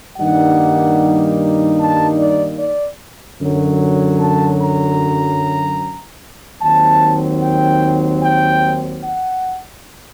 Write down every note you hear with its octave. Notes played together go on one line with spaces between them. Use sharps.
G2 D#3 G3 A#3 D#4 F#5
A5
D5
D5
F#2 D3 F#3
A5
A#5
D#2 D#3 F#3 C4 A5
G5
G5
F#5